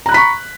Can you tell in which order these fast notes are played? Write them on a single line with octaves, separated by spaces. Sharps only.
A#5 F#6 B5 B6 C#6